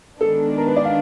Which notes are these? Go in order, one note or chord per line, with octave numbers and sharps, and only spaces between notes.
D#3 G#3 B3 D4 A4
A#4
B4
D5
F5